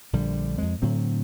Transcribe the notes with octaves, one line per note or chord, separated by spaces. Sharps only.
A#1 D3 G3
F2 G#3
A2 D3 F#3 C4